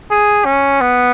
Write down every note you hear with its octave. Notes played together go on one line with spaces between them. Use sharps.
G#4
C#4
B3